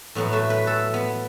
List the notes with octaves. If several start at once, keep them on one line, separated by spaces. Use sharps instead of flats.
A2 F#3 B3
A3
B4
A4
B3